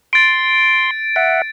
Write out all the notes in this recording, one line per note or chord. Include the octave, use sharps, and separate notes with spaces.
C6 A6 D7
E5 F#5